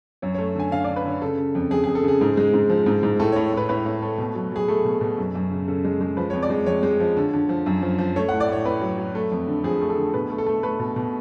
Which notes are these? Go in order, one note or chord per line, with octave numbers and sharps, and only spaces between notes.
F#2 C#5
C#5
A3
D3 G#5
D3 F5
D3 D5
B4
D3 C#5
C#3 A4
C#3
F2
F2 G#4
F2 G#4
A4
C#3 G#4
G#2
G#3
G#2
F3
G#2
G#2
A2 A4
C#5
A2
A2 B4
A2 B4
A2
A3
B2
F#3
F#3 G#4
A3 A4
B2
B2
F#2
F#2
C#3
C#3 A4
G#3
G#3
F3 B4
F2 C#5
D5
G#3
F2 C#5
G#3
F3
D3
D3
F3
F#2
F3
F3
A3 C#5
A2 F#5
D5
A2 C#5
A2 B4
F#3
F#3
A3
F2
D3
F3 G#4
A3
A4
D3
B2 B4
A3
A4
A3
A3 B4
B2
B2